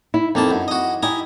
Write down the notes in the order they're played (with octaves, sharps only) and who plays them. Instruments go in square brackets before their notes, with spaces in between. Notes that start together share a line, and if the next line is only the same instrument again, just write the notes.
[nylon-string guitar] E4
[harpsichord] F2 A#3 A5 [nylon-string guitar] D#4 E4
[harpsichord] F#2
F#4 D#5
[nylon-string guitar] E4 G4 [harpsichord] D#5 G#5 A#5